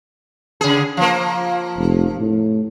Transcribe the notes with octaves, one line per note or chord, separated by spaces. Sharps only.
C#3 G#4
F3 A#3
F1
A2